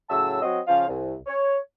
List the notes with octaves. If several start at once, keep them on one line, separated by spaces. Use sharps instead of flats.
A2 C#3 F#3 A5 E6
F#3 C4 F#4 D#5
C#3 F3 C#4 F4 C5 F5
C2
C#5